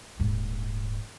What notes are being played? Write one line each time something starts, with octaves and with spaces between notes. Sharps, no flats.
D#1 G#2